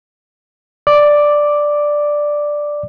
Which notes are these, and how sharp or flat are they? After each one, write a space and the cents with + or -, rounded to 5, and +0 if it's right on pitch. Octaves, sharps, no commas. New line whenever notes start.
D5 +5 D6 +0